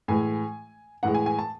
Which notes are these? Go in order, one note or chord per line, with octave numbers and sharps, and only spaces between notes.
A2 E3 G#3 G#5
A2 E3 G#3 F#5
G#5
G#5
A5